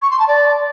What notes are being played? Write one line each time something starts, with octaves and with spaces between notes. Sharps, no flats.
C#6
C6
A5
D5